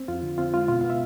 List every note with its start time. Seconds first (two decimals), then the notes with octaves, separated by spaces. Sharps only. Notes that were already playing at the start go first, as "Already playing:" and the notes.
Already playing: C4
0.08 F2 F4
0.23 D3
0.38 C4 F4
0.54 G#3 F4
0.68 B2 F4
0.81 B3 F5
0.90 E5